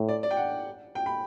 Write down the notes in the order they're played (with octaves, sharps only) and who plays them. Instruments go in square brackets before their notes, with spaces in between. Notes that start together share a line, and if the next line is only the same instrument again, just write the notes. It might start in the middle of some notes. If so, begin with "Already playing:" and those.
Already playing: [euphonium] A2
[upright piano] D5
D5
G5
F#5
G5
B5